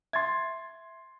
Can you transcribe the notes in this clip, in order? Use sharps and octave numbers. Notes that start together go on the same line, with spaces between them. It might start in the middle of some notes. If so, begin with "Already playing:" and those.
E5 C6 G#6 A6